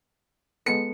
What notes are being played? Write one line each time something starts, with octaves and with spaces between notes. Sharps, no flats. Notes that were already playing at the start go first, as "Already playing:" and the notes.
G#3 B3 A4 C#7